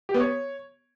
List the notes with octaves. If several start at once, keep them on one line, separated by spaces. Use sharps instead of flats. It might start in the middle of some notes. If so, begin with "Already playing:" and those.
G4
B3
C#5